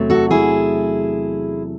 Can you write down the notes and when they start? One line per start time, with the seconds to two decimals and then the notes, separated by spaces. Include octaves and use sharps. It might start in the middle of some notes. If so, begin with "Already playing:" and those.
Already playing: E2 C3 F#3 A3
0.10 F#4 A4
0.31 E4 G#4